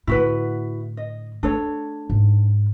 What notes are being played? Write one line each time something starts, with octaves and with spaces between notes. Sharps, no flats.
A2 D3 E4 F#4 B4
D#5
A3 D4 A4 C#5
G#2